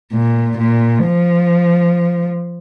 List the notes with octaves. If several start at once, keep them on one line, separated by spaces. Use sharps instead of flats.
A#2
A#2
F3